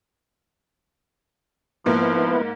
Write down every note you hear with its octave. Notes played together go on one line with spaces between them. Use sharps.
G#2 F3 A#3 B3 E4 B4